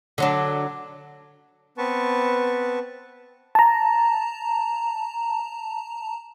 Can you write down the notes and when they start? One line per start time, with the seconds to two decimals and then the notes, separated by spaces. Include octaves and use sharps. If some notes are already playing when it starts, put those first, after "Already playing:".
0.18 D3 F#3 D4
1.78 B3 C4 B4 A5 C#6
3.55 A5 A#5